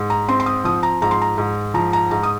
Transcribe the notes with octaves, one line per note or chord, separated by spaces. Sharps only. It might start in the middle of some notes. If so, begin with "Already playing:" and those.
Already playing: G#2
A#5
C4 C6
C6
D#6
F3 D#6
A#5
G#2 A#5
C6
A#5
G#2
F3 A#5
A#5
G#2 A#5
D#6